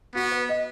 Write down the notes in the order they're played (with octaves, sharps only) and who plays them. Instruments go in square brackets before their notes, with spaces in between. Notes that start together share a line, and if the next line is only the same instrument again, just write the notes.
[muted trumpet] B3 [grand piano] F#4
[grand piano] B4
D#5